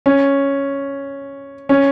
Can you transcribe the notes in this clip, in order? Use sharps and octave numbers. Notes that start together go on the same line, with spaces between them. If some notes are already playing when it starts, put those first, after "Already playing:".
C#4
C#4